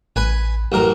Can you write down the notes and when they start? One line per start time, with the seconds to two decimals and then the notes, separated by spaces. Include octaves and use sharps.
0.16 A1 B4 G#5
0.72 A1 F#2 A#4